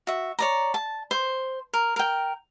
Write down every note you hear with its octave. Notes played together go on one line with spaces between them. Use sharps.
F#4 E5
C#5 D5 A#5
A5
C5
A#4
A#4 G5